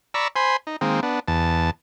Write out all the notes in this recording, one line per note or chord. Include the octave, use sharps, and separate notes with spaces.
D5 A#5 B5 C#6 E6
C5 G#5 B5 C6
D#4
D#3 G#3 A#3 C4
B3 D4
E2 A5